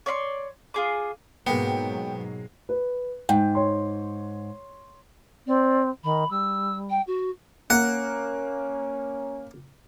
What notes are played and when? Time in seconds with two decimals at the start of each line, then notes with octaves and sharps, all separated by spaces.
0.06 C#5 D5 E5 C6
0.74 F4 G#4 D6
1.47 G#2 B2 F#3 G#3 A#3 B3 G5
2.69 B4
3.29 G#2 G5
3.55 C#5 C6
5.47 C4 D5
6.04 D#3 B5
6.30 G3 E6
6.90 G5
7.07 F#4
7.70 A#3 C#4 F#5